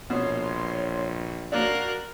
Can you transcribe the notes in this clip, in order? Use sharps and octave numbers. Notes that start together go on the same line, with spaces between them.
A#1 B2 C#5 C6
A#3 D4 F#4 A#4 F5 F#6